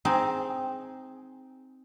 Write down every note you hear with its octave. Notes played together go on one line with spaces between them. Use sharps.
C4 D#4 G#4